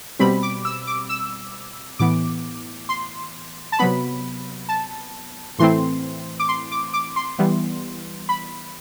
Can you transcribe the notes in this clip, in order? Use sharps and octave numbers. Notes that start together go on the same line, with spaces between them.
B2 G3 C4 B5
D6
E6
D6
E6
A2 E3 B3 D6
C6
A5
C3 F#3 B3 B5
A5
A2 E3 A3 C4 C6
D6
C6
D6
D6
C6
E3 G3 B3
B5